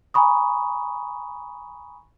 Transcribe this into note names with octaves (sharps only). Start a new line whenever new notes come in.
G#5 A#5 B5 C#6 D#6